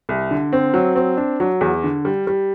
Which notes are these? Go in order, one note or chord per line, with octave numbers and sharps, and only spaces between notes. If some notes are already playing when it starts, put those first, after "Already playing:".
C2
D3
C4
F#3
C4
D4
F#3
E2
D3
G3
G3